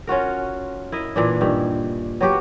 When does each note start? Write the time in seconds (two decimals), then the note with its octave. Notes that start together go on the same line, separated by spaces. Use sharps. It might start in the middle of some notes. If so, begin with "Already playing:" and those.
0.07 C#4 F4 F#4 A#4
0.92 E4 A#4 D#5
1.16 A#2 E3 D4
1.41 G2 D#3 E4
2.21 F#3 B3 F#4 G4